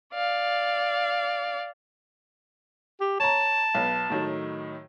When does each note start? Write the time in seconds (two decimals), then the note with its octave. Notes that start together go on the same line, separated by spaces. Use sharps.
0.14 D5 F5
3.01 G4
3.20 C#5 A5 A#5
3.75 B1 B4
4.10 A2 D#3 F#3